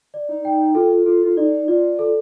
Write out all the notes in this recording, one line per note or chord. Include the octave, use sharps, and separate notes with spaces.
D5
D#4
G5
F4 A4
F4 A4
F4
D#4 D5
F4 D5
A4